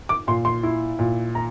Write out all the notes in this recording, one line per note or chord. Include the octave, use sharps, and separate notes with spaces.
D6
A#2 C6
C6
E4
A#2
A#5